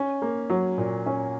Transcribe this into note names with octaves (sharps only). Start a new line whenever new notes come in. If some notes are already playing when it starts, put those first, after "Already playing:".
Already playing: C#4
A#3
F#3
A#2
C#4